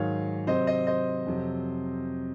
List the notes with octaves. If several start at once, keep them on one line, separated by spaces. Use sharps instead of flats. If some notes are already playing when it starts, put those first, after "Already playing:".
Already playing: G#2 D#3 F#3 C#5 F5
C3 F#3 C5 D#5
C5 D#5
C5 D#5
F2 C3 F#3